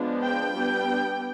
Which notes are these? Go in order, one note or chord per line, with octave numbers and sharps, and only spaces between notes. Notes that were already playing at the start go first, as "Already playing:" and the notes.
Already playing: F3 G#3 B3 D4
G5
G3 B3 D4